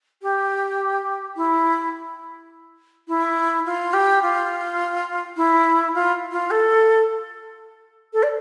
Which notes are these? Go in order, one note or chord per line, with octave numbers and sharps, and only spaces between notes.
G4
E4
E4
F4
G4
F4
E4
F4
F4
A4
A4
D5